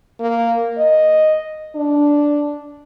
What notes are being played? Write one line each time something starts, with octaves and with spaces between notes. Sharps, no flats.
A#3
D#5
D4